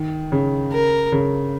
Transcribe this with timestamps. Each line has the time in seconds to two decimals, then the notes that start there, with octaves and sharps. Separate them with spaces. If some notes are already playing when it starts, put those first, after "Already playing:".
Already playing: D#3
0.32 C#3
0.72 A#4
1.12 C#3